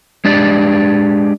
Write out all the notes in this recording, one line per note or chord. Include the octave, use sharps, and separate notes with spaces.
G#3 D4 G4 D5